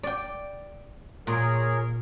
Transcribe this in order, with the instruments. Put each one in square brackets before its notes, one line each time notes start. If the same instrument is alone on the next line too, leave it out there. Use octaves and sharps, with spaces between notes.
[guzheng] D5 G5
[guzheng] A#2 [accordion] G#4 A#4 C#5